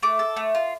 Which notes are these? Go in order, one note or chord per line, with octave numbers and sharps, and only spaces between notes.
A3 D6
A4
A3
F4